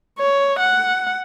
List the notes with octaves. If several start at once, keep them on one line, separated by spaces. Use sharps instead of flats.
C#5
F#5